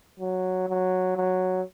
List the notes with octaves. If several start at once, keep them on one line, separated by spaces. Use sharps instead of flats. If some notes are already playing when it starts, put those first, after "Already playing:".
F#3
F#3
F#3